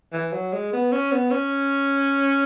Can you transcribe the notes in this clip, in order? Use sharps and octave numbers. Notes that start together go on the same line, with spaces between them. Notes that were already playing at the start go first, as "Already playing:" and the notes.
E3
F#3
G#3
B3
C#4
B3
C#4